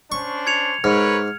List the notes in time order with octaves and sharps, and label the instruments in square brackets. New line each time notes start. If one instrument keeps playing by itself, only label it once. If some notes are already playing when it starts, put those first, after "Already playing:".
[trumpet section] C#4 D4 C5 [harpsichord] C#6
[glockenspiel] G#6 C#7 F7
[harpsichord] G#2 [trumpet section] A#4 B4 C#5 [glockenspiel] F6